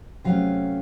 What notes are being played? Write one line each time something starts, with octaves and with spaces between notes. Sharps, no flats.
C3 F#3 A3 C#4 F5